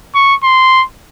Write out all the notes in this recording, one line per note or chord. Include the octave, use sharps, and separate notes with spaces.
C#6
C6